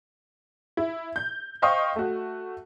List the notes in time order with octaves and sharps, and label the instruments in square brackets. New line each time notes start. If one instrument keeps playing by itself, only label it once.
[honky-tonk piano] E4
G6
C5 D#5 F5 G5 C#6 D#6
A3 F#4